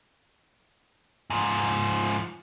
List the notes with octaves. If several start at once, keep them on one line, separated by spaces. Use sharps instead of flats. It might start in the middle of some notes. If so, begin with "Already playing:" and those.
G#2 F3